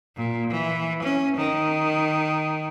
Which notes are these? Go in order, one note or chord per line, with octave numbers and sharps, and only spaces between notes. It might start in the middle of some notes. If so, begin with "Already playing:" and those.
A#2
E3
C#4
D#3